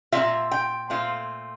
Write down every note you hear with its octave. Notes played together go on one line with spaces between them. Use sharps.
A#2 A3 C4 F4 E5
G5
A#2 A3 C4 F4